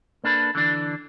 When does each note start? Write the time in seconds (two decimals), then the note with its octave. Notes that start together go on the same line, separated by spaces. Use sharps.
0.24 A#3 D4 A4 B4
0.55 D3 E3 D4